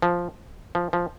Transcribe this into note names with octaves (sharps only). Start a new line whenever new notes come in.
F3
F3
F3